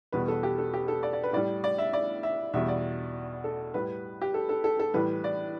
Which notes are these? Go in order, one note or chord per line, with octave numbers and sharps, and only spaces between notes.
E2 B2 G3 B4
A4
G4
A4
G4
A4
D5
D5
B4
A2 G3 D5
D5
E5
D5
E5
E2 B2 G3 E5
D5
A4
A2 G3 B4
G4
A4
A4
A4
A4
A2 E3 G3 B4
D5